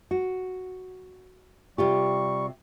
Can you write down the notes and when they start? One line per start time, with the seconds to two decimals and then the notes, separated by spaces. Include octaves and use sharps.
0.11 F#4
1.78 C3 G3 F4 G4 C#6